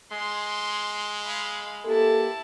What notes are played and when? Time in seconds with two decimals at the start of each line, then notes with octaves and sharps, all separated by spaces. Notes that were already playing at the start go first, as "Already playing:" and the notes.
0.12 G#3 C6
1.24 F5 B5
1.85 A#3 E4 G4 A4 A5